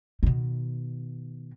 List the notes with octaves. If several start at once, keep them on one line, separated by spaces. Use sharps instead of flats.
B2 D#3